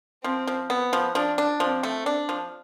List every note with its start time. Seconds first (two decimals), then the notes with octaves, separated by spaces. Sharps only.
0.24 F3 C4
0.47 F3
0.70 B3
0.93 F3
1.15 F3 D4
1.38 D4
1.60 F3 C4
1.83 A3
2.06 D4
2.29 F3